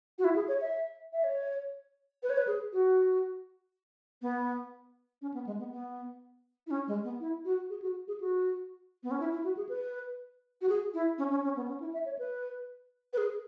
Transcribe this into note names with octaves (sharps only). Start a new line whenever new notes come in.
F#4
E4
G#4
C#5
E5
E5
C#5
B4
C#5
B4
G#4
F#4
B3
C#4
B3
G#3
B3
B3
E4
C#4
G#3
B3
E4
F#4
G#4
F#4
G#4
F#4
B3
C#4
E4
E4
F#4
G#4
B4
F#4
G#4
E4
C#4
C#4
C#4
B3
C#4
E4
E5
C#5
B4
B4
G#4